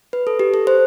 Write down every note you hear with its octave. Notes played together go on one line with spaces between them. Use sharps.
B4
A4
G4
A4
C5